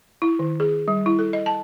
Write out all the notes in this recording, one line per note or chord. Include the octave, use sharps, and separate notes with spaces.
E4
D#3
G#4
G3
E4
A4
D#5
A5